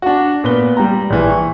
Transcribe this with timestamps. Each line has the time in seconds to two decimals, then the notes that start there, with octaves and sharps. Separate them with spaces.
0.02 D4 F#4
0.44 A#2 B3 B4 G7
0.77 G3 G5 A#5
1.10 A#1 E3
1.30 C#6